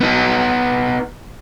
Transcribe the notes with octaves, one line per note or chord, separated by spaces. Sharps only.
B3 D#4